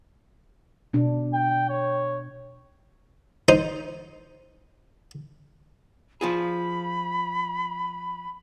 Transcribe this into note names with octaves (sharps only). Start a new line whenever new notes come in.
B2 D4
G5
C#5
D#4 C5
F3 F4 G#4 B5